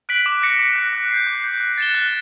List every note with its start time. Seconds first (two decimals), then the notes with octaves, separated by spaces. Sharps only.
0.09 F#6 B6 D7 F#7
0.26 D6
0.42 F#6 A#6 C#7
0.59 D6
0.76 F#6 A#6 C#7
0.93 D6
1.11 G6 C7
1.27 D6
1.44 G6 C7
1.60 F#6
1.78 A6 C#7 E7 G7
1.95 F#6